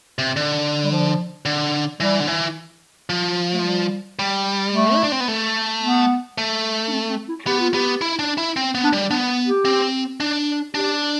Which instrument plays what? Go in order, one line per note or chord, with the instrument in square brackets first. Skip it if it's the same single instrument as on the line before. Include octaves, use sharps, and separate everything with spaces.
[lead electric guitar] C3
D3
[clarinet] G3
F3
[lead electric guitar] D3
[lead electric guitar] E3 [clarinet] G3
[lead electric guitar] D3
E3
F3
[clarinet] A3
G3
[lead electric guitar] G3
[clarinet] A3
[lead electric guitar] E4
D4
C4
B3
A3
[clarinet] B3
[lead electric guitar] A3
[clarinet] D4
C4
C4
E4
[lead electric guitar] B3 [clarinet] G4
[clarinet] F4
[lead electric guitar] B3 [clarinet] G4
[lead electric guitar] E4
D4
E4
C4
B3
[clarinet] D4
[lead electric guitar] G3
[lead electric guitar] B3 [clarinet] D4
[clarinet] G4
[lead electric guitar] C4
D4
[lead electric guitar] D4 [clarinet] G4